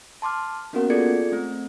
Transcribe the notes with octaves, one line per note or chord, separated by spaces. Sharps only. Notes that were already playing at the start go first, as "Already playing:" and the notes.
A5 C6 D6 F6
A#3 B3 C#4 F#4 A#4 F#5
F4 G#4 A4 D5 G#6 C#7
A3 C4